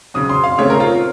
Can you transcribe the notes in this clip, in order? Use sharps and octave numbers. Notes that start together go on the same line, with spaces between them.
C#3 F#3 C4 D#6
C6
F5
C#3 A3 C4 C#5
A#4
F4